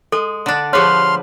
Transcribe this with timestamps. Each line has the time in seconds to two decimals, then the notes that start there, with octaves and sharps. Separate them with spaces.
0.12 G#3 A4
0.46 D3 D4
0.73 F3 G4 G#4 B4 C#5 C6 F6